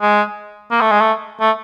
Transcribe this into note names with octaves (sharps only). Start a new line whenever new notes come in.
G#3
A#3
A3
G#3
A3
A3